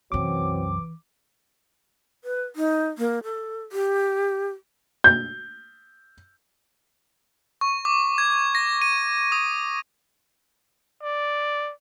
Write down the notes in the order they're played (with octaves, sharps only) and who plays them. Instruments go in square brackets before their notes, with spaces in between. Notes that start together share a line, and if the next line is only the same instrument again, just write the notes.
[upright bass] C2 F#2 [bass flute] E3 [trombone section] F#3 C4 [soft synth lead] D6
[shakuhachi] B4
D#4
A#3
A4
G4
[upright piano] G6
[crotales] C#6
D6
G#6
A#6
D#7
D#6
[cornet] D5